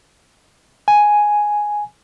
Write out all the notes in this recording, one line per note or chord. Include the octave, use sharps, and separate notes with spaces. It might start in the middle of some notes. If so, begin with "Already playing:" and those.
G#5